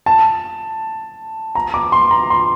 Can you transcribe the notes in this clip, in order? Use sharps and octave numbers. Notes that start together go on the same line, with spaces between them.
A5
A#5
D6
C6
A#5
C6